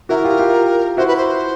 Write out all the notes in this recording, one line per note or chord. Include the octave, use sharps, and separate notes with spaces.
E4 F#4 A#4
F4 G4
F4 G4
E4 F#4 C5
B4
C5